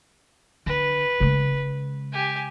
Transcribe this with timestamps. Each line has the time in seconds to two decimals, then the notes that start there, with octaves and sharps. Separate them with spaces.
0.66 D3 B4
1.20 C#3 G#3
2.12 G4 G#5